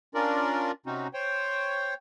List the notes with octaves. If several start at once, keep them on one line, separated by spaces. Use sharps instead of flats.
C#4 D4 F4 A#4 D5
C3 C4 C#4 D#4 F#4
C5 C#5 G5